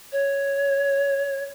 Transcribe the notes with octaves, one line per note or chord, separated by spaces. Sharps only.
C#5